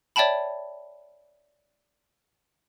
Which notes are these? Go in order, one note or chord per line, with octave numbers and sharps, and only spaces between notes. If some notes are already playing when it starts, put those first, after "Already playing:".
C#5 D5 E5 G5 A5 B5